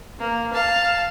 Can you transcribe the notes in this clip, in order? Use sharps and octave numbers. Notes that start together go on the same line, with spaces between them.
A#3
F5 A5